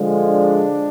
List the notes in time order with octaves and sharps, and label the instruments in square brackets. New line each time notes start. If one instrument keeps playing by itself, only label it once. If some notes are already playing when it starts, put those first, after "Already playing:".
Already playing: [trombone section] D3 F3 G#3
[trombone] D4